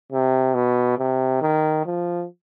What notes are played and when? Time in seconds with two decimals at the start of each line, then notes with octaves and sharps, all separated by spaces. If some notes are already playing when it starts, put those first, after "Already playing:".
0.12 C3
0.55 B2
0.99 C3
1.42 D#3
1.86 F3